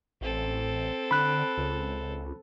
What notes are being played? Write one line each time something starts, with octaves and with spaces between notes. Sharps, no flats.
A1 C4 A4
D3 B5 F#6
C#2